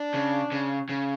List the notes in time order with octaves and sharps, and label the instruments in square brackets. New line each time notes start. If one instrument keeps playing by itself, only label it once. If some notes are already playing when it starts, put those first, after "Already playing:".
Already playing: [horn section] D4
[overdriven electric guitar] C#3
C#3
C#3